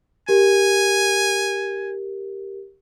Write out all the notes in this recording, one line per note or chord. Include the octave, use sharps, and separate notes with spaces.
G4 A#4 G#5